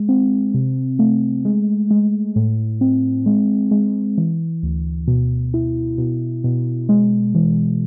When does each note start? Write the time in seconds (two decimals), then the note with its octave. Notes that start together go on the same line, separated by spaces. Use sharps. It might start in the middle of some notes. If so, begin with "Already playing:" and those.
Already playing: G#3
0.09 C4
0.54 C3
0.99 A3
1.45 G#3
1.91 G#3
2.36 A2
2.81 C4
3.26 G#3
3.71 G#3
4.18 E3
4.63 D2
5.08 B2
5.54 E4
5.98 B2
6.44 B2
6.89 G#3
7.35 E3